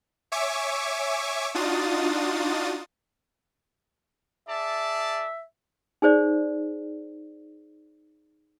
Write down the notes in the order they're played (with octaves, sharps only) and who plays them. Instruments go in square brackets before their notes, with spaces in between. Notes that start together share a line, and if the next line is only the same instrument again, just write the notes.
[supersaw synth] C#5 E5 G#5 C#6 D6
D4 D#4 F4 F#4 D#6 A6
[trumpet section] G#4 D5 A5 [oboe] E5
[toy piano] D#4 G#4 C5 D5